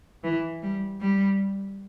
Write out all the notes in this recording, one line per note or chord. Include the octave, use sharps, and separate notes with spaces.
E3
G3
G3